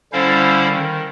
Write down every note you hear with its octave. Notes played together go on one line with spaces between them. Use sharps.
D3 G3 C#4 E4 C5 F5
D#3